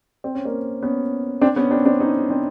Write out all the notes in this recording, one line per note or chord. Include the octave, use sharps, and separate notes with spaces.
C4
C#4
A#3 C4
B3 C#4
C4 D4
B3 C#4
C4 D4
C4 D4
C#4 D#4
C4 D4